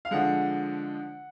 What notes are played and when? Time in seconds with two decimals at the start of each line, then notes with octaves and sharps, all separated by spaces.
0.05 F5
0.11 D3 F3 G#3 F#5